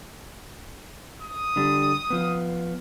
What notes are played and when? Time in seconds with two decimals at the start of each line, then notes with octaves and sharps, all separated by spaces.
1.22 D#6
1.56 D3 G3
2.10 F3 B3